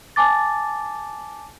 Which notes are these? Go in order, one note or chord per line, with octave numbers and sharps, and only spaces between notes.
G#5 A5 D6 A6